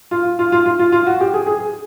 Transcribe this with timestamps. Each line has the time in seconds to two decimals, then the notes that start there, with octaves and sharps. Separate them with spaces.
0.11 F4
0.39 F4
0.52 F4
0.66 F4
0.79 F4
0.92 F4
1.07 F#4
1.21 G4
1.34 G#4
1.47 G#4